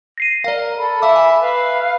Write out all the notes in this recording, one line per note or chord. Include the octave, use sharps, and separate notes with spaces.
A#6 C7 D#7
A#4 D5 F5
A4 B5
E5 F5 D6
G#5
B4 F5